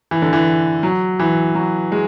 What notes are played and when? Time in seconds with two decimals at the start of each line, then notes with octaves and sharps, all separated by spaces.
0.11 E3
0.22 D3
0.33 E3
0.83 F#3
1.19 E3
1.55 F#3
1.92 G#3